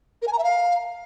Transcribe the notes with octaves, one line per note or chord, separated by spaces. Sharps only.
A#4
G#5
A#5
E5
F5